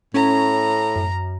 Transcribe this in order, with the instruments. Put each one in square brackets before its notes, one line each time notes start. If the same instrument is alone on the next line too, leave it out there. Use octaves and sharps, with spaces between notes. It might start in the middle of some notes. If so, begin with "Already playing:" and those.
[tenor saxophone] A2 [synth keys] C#4 [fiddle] A#5
[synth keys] F#2